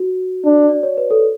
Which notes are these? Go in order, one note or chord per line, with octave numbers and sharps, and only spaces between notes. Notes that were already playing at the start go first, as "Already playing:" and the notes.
Already playing: F#4
D4
D5
C#5
B4
A4